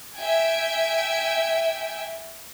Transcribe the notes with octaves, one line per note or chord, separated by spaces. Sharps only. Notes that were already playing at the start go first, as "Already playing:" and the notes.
E5 G5 G#5